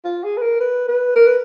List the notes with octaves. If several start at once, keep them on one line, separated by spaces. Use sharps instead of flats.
F4
G#4
B4
A#4
B4
B4
A#4
B4